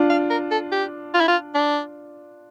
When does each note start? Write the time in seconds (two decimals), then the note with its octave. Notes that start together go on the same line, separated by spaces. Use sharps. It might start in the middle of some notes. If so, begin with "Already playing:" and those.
Already playing: D4 F4
0.10 F5
0.30 A#4
0.51 A4
0.72 G4
1.14 F4
1.21 E4
1.28 F4
1.55 D4